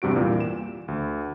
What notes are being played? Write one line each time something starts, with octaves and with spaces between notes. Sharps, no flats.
E2 G2 C3 F#4 D7
A#2 E3 G3
E7
D2